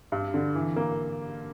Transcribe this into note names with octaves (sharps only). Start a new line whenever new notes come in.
G2
D3
E3
A#3